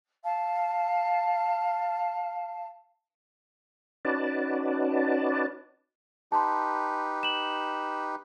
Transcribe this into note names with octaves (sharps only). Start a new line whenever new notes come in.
F5 A5
C#4 D#4 F#4 B4 D5 A5
D#4 G4 B4 A5 C6
E7 F#7